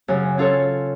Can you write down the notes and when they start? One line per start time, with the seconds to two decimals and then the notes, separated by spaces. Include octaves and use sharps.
0.08 F#2 C#3
0.38 C#4 F4 A4 C#5